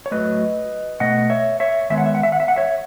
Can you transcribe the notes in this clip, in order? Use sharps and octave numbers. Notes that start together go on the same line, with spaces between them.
C#5
A2 F#3 A3 B4 D#5
B2 A3 D#5 F#5
C#5 E5
C#5 E5
D#3 G#3 B3 E5
F#5
E5
F#5
E5
F#5
E5
F#5
C#5 E5